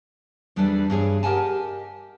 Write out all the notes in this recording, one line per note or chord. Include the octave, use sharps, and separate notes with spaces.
E2 G3 D4 A4 B4 D5
G2 D4 G#4 C#5
G4 A#4 D#5 F#5 G#5 A5